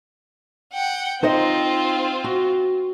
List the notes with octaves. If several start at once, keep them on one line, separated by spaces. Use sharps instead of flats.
F#5 G5
C4 D#4 F4 C5 D#5
F#4